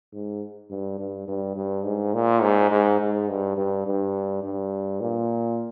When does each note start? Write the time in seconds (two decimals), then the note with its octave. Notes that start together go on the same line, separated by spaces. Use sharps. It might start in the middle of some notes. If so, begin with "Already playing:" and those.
0.13 G#2
0.70 G2
0.99 G2
1.28 G2
1.56 G2
1.85 G#2
2.14 A#2
2.42 G#2
2.71 G#2
3.00 G#2
3.29 G2
3.57 G2
3.86 G2
4.43 G2
5.01 A#2